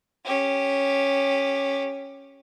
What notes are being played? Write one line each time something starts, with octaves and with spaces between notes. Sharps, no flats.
C#4 G4